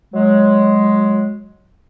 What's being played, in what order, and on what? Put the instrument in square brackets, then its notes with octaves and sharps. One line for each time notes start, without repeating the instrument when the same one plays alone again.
[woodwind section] F#3 G#3